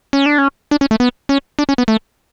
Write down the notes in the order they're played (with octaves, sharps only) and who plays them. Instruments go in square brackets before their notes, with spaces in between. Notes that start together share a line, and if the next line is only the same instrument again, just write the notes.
[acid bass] C#4
D4
C#4
D4
C#4
A3
B3
C#4
D4
C#4
B3
A3